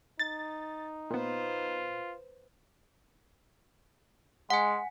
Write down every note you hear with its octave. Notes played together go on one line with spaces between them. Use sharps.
D#4 A6
A#2 B3 F4 B4 C5
G#3 F#5 G#5